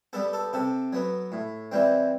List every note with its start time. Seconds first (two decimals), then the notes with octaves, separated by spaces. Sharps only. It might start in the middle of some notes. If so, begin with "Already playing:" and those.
0.13 G3 B3 A4
0.33 A4
0.53 C3 A4
0.93 F#3 B3
1.32 A2
1.72 E3 G3 C4